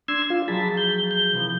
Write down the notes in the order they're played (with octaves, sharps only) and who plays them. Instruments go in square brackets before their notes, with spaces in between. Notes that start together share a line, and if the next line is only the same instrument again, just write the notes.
[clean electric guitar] D4 [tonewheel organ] C6 E6 G#6
[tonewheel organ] F4
[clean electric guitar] F3 F#3 G#4 [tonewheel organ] A5 B5
[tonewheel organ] G6
G6
[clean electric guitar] C3 E3 F3